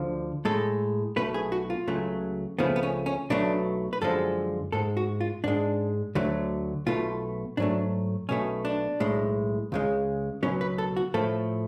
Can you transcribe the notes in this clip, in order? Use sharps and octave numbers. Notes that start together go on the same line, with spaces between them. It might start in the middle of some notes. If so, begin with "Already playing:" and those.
Already playing: D2 D3 F3
A2 G#3 A4
B1 B2 A3 B4
G#4
F#4
F4
C#2 C#3 F#3 A3
C#2 C#3 F3 A3 B3
B3
C#4
C#4
B1 B2 F#3 A3 D4
B4
F#2 D3 F3 G#3 A4
G#2 G#3 A4
F#4
F4
G#2 G#3 D4
D2 D3 F#3 A3
B1 B2 A3 F4
G#2 F#3 A3 D4
B1 B2 A3 C#4
D4
B1 A2 G#3
C#2 C#3 G#3
C#2 B2 F#3 C#4
B4
A4
F#4
A2 F3 A3 A4